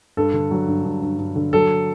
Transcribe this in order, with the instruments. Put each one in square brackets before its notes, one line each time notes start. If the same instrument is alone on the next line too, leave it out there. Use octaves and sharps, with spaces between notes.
[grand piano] G2 A4
D3
F#3
G2
G2
G2
G2
D3
F#3 A4